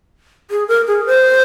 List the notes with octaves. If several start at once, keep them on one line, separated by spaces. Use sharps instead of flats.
G#4
A#4
G#4
C5